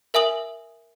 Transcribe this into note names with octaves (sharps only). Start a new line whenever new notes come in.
A#4 E5 G#5 D#6 F#7